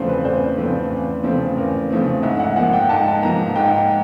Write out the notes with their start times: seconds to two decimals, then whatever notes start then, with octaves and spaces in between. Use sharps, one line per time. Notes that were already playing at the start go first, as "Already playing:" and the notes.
Already playing: E2 C#3 F3 A3 C4 C5
0.09 B4
0.24 E2 C5
0.57 C#3 F3 A3 C4
0.91 E2
1.23 C#3 F3 A3 C4
1.57 E2 A#4
1.90 C#3 F3 A3 C4
2.23 G#2 E5
2.39 F#5
2.56 F3 A#3 F#5
2.73 G5
2.89 G#2 A5
3.22 F3 A#3 A#5
3.55 G#2 G5